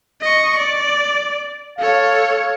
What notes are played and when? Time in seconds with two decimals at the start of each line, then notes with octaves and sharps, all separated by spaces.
0.21 D#5 C#6
0.58 D5
1.79 A4 C#5 F5